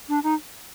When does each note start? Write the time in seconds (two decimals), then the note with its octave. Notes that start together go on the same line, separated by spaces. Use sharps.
0.09 D4
0.24 D#4